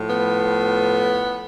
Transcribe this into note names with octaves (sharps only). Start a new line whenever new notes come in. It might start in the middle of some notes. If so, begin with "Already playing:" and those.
Already playing: A2 F3
B3